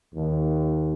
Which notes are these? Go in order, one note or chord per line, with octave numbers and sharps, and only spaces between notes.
D#2